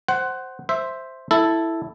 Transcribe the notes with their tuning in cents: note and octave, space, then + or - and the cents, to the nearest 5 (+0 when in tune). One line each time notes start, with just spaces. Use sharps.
C5 +0 F#5 +15
C5 +0 E5 +0
E4 +0 A4 +0